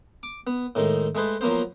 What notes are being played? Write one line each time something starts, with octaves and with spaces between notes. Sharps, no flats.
D6
B3
A2 D#3 G#3
G#3 A3 G#4 B4 C5
F3 F#3 A#3 B3 C5